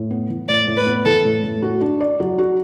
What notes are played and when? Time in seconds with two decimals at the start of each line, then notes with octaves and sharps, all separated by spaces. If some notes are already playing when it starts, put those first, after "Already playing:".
Already playing: A2
0.11 B3
0.30 E3
0.49 A2 D5
0.68 A2
0.77 B4
0.87 B3
1.05 E3 A4
1.25 A2
1.44 A2
1.62 F#4
1.81 D4
2.00 D5
2.20 F#3
2.38 F#4